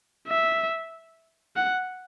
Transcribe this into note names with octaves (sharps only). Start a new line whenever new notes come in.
E5
F#5